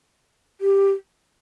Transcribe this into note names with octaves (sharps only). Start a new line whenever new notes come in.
G4